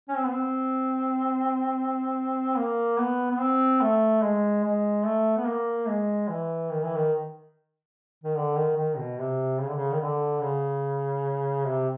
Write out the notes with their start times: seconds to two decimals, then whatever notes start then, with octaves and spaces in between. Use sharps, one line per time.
0.09 C#4
0.16 C4
0.24 B3
0.31 C4
2.57 A#3
2.98 B3
3.31 B3
3.39 C4
3.81 A3
4.22 G#3
4.64 G#3
5.05 A3
5.37 B3
5.46 A#3
5.88 G#3
6.28 E3
6.70 D#3
6.82 E3
6.94 D#3
8.24 D#3
8.35 D3
8.56 D#3
8.77 D#3
8.98 B2
9.18 C3
9.60 C#3
9.67 D3
9.75 C#3
9.93 D#3
10.01 D3
10.42 C#3
11.66 C3